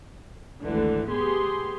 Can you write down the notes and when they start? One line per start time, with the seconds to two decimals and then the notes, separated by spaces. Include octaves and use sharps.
0.61 G#1 D2 D3 E3
1.09 B3 G4 G#4 C6